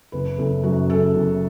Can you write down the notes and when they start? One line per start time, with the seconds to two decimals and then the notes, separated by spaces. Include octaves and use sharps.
0.12 F#1 B4
0.38 F#1 A4
0.63 F#2 F#4
0.89 C#3 A4
1.15 F#1